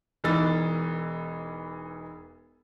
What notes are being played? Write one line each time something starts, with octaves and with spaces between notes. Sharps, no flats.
E1 E3 B3 D#4 E6 A6